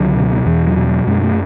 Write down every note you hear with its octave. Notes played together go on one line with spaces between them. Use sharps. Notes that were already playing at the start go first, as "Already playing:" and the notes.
Already playing: C#2 D3 F#3
B2
E2 E3
F#3
B2
F#3
F#2 G#3
A3